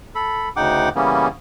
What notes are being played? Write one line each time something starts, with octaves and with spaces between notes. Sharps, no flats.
A4 B5
D2 C#3 D#4 F#5 G5 D6
C#3 E3 G3 A#3 B3 C#4